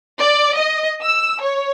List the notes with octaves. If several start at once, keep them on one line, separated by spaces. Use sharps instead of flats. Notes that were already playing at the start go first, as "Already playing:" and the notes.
D5
D#5
E6
C#5